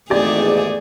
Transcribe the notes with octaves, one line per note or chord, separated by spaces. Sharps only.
G#1 E2 A3 G4 G#4 D5